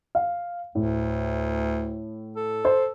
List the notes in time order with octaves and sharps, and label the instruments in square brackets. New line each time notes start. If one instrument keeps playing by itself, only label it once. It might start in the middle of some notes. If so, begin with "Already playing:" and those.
[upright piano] F5
[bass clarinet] D2 [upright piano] A2
[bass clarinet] A4
[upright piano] C5